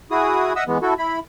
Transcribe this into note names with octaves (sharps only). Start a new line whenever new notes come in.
E4 F#4 G#4 D#6
D#5 E5 F#5 D#6 E6
E3 G#3 B3
E4 F#4 A4
E4 B5